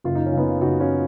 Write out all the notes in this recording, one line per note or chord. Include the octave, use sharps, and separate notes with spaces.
F#1 F4
D#4
C#4
C#3 B3 D#4
F#1 D#4 F#4
C#4 F4